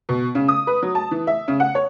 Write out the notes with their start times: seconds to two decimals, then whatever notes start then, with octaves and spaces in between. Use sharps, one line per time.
0.09 B2
0.35 C#3
0.48 D#6
0.67 B4
0.82 F#3
0.95 A5
1.11 E3
1.27 E5
1.48 C#3
1.60 F#5
1.75 C#5